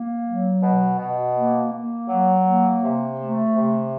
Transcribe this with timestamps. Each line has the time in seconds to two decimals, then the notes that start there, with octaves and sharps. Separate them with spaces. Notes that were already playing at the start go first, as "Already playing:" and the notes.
Already playing: A#3
0.26 F#3
0.63 B2
0.99 B2
1.35 A#3
1.73 A#3
2.09 F#3
2.46 A#3
2.83 C3
3.19 A3
3.56 C3